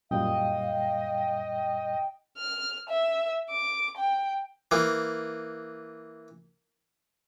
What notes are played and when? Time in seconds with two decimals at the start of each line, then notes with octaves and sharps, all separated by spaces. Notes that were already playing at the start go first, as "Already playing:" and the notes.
0.11 F#2 A#2 G3 D#5 F5 G5
2.38 F6
2.89 E5
3.51 D6
3.97 G5
4.71 E3 A#3